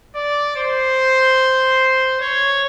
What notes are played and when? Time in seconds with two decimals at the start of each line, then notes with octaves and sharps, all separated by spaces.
0.15 D5
0.56 C5
2.21 C#5